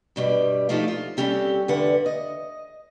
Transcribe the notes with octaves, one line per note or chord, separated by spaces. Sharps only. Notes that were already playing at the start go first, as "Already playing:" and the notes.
G2 B2 G3
F3 G3 A3 D#4 F4 F#4
F4
G3 C4 C#4 G4 A4
E2 G2 D3 B4 F#5
D#5